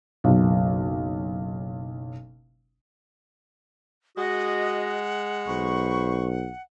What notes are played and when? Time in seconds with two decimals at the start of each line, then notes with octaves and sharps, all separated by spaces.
0.24 F#1 B1
4.17 G#3 F#4 D#5 F#5
5.48 B1 C5 B5 C#6